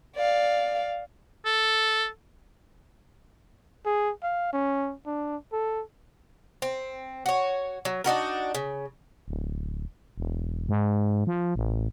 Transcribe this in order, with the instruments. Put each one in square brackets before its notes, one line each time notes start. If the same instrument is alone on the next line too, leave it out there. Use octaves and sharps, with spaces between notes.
[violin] D5 F5
[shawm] A4
[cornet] G#4
F5
C#4
D4
A4
[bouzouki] C4
F#4 C#5
F#3
D4 D#4 F#4 A#4
C#3
[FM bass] D1
E1
G#2
F3
A1